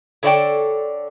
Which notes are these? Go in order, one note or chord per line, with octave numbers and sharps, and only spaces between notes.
D3 A4 C#5 D5 G5